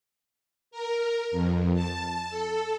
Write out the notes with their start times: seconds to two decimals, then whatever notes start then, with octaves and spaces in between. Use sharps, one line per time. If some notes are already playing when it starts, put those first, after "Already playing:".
0.71 A#4
1.32 F2
1.74 A5
2.30 A4